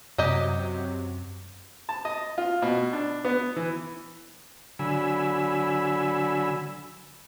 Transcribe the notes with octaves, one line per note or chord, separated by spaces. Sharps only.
F#2 C3 F#3 G4 D#5 A#5
A5
D#5
F4
B2
D4
B3
E3
D3 F#3 G#5 B5 E6